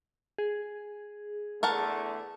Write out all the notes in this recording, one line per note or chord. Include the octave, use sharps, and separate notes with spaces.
G#4
E2 D3 A3 A#4 F#5 A5